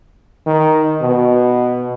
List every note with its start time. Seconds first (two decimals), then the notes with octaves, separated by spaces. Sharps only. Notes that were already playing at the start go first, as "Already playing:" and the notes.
0.46 D#3
1.02 B2